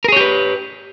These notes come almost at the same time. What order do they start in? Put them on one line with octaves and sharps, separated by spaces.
A#4 G#4 C#5 G4 B4